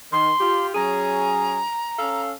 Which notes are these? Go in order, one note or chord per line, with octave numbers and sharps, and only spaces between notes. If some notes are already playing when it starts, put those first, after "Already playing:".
D#3 C6
F4 G4
F#3 C#4 G#4 A#5
C#4 A4 F5